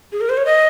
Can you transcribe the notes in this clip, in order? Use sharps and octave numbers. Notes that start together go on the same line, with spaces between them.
G#4
A#4
C5
C#5
D#5